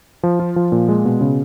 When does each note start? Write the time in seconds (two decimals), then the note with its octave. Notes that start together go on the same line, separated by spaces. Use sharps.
0.23 F3
0.39 F4
0.56 F3
0.72 A#2
0.89 G#3
1.05 B2
1.21 C#3